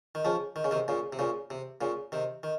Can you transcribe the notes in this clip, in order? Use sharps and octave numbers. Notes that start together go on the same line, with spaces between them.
D#3
C#3 F3
D#3
C#3
C3 D#3
A#2 C#3
C3
A#2 C#3
C3
A#2 C#3
C3 D#3
D#3